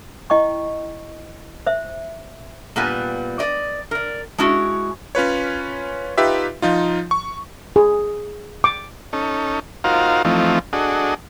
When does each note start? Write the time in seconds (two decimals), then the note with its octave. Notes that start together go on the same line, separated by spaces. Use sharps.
0.30 E4 D#5 G5 C#6
1.67 C5 E5
2.76 A#2 G3 B3 B4 G#5
3.39 D5 D#5
3.91 A#4 D5
4.38 G#3 C#4 E4 F#4
5.15 C#4 F4 B4 C#5
6.17 D#4 F4 G4 B4 E5
6.62 F3 D#4 F4
7.11 C#6
7.76 G#4
8.64 D6
9.13 C#4 D#4 A4
9.84 D#4 F4 F#4 A#4 C5 F5
10.25 E3 F3 A3 C4 D#4 F4
10.73 D4 F#4 G#4 A4 D#5